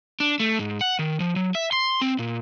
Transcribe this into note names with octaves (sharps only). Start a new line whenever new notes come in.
D4
A3
G#2
F#5
D#3
F3
F#3
E5
C6
C4
A#2